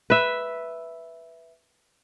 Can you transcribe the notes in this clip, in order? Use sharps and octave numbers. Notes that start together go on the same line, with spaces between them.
B4 E5